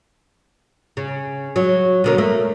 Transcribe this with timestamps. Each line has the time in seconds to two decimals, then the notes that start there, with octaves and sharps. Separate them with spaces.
0.97 C#3
1.56 F#3
2.04 B2 D3 A#3
2.18 A3 A#3